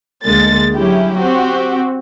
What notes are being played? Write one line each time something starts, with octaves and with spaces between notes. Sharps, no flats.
D2 D3 G#3 A#3 A6
F#3 C#4 E4 G4
C4 F#4 G4